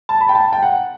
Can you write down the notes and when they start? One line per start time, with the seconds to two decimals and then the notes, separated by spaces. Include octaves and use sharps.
0.09 A5
0.21 B5
0.29 G5
0.35 A5
0.53 G5
0.63 F#5